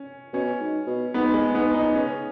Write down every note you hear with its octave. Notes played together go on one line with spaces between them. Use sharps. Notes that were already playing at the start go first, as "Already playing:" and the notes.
Already playing: C#4
B2 C#4
G#2
B2
G#2 B3
G#3
G#2 B3
D#4
C#3 C#4